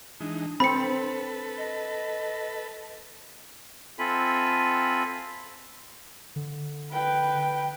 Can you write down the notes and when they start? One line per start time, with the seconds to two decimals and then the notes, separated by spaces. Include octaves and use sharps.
0.21 E3 G#3 D4 D#4
0.60 C4 A4 B4 B5 C#7
1.58 D#5
3.99 C4 F4 A4 E5 G#5 B5
6.36 D3
6.91 B4 G5